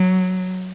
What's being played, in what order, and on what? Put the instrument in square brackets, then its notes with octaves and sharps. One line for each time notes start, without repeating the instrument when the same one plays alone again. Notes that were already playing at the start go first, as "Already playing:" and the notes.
Already playing: [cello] F#3